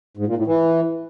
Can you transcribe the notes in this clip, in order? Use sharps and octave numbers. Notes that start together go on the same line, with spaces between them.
G#2
A#2
A2
E3